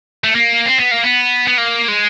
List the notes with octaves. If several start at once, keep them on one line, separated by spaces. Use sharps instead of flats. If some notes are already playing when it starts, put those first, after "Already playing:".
A3
A#3
C4
B3
A#3
B3
B3
A#3
G#3